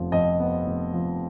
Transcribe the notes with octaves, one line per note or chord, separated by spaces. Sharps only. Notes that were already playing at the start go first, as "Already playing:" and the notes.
Already playing: F1 F2 F3 B3
F2 D#5
B3
F1
F3